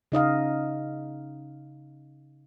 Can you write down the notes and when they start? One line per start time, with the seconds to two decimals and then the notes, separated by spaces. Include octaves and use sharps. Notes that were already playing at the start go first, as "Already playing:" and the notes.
0.12 C#3 D#4 D#5 F5